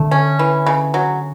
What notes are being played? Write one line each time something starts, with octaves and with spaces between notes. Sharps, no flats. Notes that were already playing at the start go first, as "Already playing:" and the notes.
Already playing: D3 A3
C#4
E3
C#3
F#3